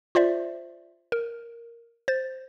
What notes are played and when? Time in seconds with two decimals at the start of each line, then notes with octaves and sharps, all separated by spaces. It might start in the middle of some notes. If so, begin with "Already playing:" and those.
0.15 F4 C5 D5 E5
1.12 A#4
2.08 C5 A6